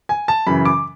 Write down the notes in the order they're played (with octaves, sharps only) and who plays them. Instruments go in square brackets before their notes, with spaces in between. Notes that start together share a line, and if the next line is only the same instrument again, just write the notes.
[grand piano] G#5
A5
F#2 C#3 E3 B5
D6